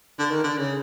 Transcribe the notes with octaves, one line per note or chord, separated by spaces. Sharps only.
D3
D#3
D3
C#3